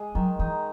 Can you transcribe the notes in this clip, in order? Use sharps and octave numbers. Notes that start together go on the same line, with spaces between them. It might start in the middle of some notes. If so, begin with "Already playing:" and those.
Already playing: G#3 G#4
D#3 F#3
E3 D#4